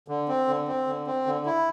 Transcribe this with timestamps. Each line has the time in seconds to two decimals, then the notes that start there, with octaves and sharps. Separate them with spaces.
0.08 D3
0.28 C4
0.48 D3
0.68 C4
0.87 D3
1.07 C4
1.26 D3
1.46 E4